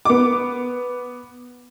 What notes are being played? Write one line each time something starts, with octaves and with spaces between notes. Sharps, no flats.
B3 D6